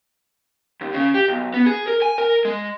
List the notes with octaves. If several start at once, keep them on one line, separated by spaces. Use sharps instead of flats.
D#2
C#3
G4
B1
B3
G#4
A#4
G#5
A#4
G#3